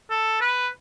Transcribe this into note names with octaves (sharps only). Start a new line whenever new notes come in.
A4
B4